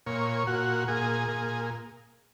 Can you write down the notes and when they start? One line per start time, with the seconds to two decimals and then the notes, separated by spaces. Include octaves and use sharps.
0.06 A#2 C#5
0.47 A#2 F#4
0.88 A#2 G#4
1.28 A#2